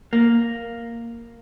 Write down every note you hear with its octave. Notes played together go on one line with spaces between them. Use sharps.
A#3